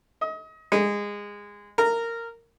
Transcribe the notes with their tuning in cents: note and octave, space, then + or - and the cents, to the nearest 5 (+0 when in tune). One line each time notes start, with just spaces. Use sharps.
D#5 +30
G#3 -20
A#4 -15